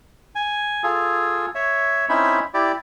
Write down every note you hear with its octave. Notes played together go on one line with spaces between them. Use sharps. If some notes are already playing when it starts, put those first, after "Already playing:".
G#5
F4 G#4 A4
C#5 E5
C4 C#4 D#4 E4 E5 B5
E4 G4 D5